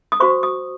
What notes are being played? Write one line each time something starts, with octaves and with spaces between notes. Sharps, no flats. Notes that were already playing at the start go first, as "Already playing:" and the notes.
D#6
F#4 C5 C#6
D#6